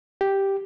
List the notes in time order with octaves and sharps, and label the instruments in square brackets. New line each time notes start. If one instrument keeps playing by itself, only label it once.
[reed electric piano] G4